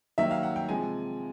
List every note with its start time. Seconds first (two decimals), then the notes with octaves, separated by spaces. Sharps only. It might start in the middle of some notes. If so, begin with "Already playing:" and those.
0.18 D#3 F#3 A#3 E5
0.31 F5
0.43 F#5
0.56 G5
0.69 C3 F3 G#3 G#5